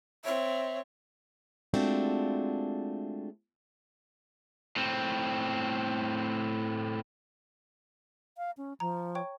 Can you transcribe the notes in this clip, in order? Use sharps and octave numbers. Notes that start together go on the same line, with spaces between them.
C4 C#5 E5
G#3 A3 C4 D4 F4 F#4
A2 C4
F5
C#4
F3 A#5
C#5 G5 C#6